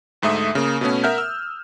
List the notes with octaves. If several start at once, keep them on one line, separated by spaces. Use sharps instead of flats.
D2 G#2 A3 E5 D#6
C#3 A#3
B2 A3 B3 C#4
A#4 E5 F#5 F6 G6
E6